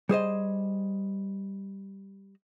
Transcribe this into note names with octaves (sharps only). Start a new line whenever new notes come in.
G3 G#4 C5 D#5